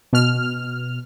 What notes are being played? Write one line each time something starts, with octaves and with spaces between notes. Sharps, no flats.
B2 F6